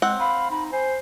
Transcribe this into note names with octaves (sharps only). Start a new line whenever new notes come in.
G#3 C4 F#5
F5 B5
D#4 B5
C5 G#5